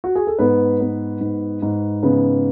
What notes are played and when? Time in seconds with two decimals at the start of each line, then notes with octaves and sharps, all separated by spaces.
0.04 F#4
0.16 G#4
0.27 A4
0.39 G#2 B3 B4
0.80 B3
1.20 G#2
1.62 G#2
2.03 C#3 B3 B4